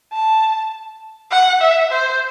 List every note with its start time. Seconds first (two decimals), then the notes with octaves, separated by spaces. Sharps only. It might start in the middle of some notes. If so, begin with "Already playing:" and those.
0.13 A5
1.31 F#5
1.61 E5
1.92 C5